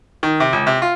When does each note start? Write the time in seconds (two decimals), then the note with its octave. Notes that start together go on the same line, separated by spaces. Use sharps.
0.23 D#3
0.40 C3
0.53 C#2
0.67 C3
0.82 F4